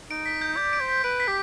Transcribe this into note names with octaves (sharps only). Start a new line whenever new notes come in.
D#4 D7
B6
G6
D5 G6
D7
C5
B6
B4 D7
B6
G4